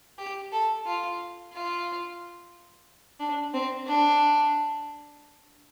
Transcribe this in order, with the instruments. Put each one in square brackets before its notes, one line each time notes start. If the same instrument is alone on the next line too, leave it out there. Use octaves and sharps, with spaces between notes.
[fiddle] G4
A4
F4
F4
D4
C4
D4